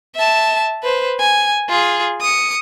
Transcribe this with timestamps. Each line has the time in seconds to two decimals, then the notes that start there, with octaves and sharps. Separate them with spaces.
0.15 E5 A5
0.83 B4 C5
1.20 G#5
1.69 F4 G#4
2.21 D#6 C#7